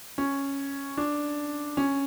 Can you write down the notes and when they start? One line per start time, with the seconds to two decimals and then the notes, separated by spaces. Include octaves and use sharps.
0.18 C#4
0.97 D4
1.77 C#4